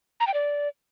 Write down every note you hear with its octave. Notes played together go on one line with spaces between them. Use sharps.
A#5
G5
D5